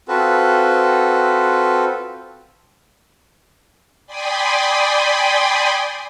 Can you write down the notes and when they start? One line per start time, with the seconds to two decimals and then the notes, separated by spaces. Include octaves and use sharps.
0.08 C4 F4 F#4 A4 B4
4.06 D5 G5 G#5 B5 C6 D#6